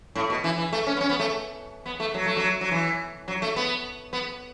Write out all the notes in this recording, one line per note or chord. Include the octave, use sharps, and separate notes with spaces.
A2
B2
E3
E3
A3
C#4
B3
C#4
B3
A3
B3
A3
F#3
A3
F#3
F#3
E3
F#3
A3
B3
B3